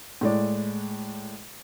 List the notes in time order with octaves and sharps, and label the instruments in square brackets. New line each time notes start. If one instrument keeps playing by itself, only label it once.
[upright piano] A2 G#3 D5